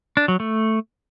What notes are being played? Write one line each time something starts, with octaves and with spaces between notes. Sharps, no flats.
D4
F#3
A3